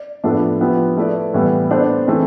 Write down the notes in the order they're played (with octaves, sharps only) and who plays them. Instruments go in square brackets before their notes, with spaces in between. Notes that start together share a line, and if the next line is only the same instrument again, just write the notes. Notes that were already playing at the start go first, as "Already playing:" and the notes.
Already playing: [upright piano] D5
A2 F3 B3 D4 A4
F3 B3 E4 G4 B4
A3 E4 B4 D5
A2 E3 G3 B3
B3 D4 A4 C5
E3 A3 C4 E4